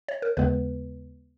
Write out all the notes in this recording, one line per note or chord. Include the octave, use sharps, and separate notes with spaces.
C#5
A#4
D#2 C#3 G#3 B3 B4